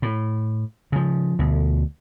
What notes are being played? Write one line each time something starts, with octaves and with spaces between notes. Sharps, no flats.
A2
C#3 F3
D2 B2